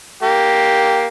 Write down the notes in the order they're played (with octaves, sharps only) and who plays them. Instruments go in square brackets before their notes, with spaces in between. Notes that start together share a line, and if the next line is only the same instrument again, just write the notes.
[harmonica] A#3 G4